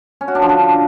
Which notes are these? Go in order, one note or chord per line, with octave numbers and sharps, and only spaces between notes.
C#4
F#4
D4
F3
D3